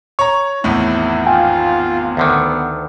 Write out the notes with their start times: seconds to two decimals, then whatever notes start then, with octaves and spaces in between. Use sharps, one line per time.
0.19 C#5 A#5 C#6
0.64 G#1 E2 A2 E4
1.26 F4 F5 G5 G#5
2.17 D2 D3 D#3 B3